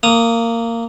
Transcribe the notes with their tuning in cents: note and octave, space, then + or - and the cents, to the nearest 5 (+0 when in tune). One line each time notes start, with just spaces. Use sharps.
A#3 -15 D#6 +0